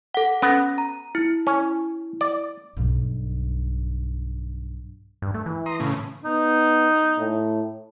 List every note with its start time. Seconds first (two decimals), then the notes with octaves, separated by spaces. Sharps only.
0.14 A4 F#5
0.42 B3 C#4 A#6
0.78 A#5
1.15 E4
1.47 C#4
2.21 D5
2.77 B1 G2
5.22 G2
5.34 A3
5.46 E3
5.66 A#5 C6 D#6
5.80 A2 C#3
6.25 B3 D#4
7.19 A2